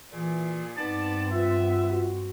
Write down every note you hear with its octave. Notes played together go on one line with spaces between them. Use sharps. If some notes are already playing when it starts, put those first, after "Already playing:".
A#2 E3 G#4
G2 B3 C4 D#4 D5 A5 A6
B3 F4 E5
F#4